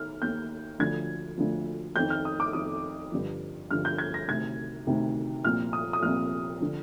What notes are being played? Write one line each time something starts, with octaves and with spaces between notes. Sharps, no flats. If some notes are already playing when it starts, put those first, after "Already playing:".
Already playing: D#3 F6
D#2 D#3 G6
D2 D3 F3 G#6
D2 D3 F3
F2 D#3 G6
F6
D#6
D6
F2 D#3 D#6
G2 D3 F3
G2 D3 F3 F6
G6
G#6
A#6
D2 C3 D#3 G#6
D2 C3 D#3
C2 A#2 F3 F6
D#6
D#6
C2 A#2 F3 F6
D3 F3